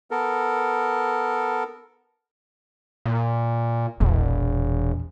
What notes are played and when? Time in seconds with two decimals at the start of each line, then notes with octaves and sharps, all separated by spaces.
0.11 B3 A4 A#4
3.06 A#2
4.00 E1 A#1 E2